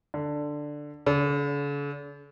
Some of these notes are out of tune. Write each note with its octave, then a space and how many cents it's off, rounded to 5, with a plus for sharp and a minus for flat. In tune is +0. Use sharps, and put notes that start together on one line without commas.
D3 +5
D3 -45